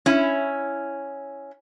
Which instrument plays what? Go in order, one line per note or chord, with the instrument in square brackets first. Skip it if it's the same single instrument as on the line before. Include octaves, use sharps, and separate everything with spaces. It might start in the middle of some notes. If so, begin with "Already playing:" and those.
[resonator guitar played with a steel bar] C#4 E4